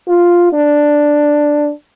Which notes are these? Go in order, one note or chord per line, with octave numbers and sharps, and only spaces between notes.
F4
D4